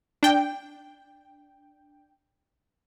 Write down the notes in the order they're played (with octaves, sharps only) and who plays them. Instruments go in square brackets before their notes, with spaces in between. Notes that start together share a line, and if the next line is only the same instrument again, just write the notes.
[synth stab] D4 G5